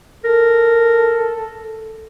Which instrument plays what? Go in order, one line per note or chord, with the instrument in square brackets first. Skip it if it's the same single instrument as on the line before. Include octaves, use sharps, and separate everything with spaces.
[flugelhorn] A4 [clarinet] A#4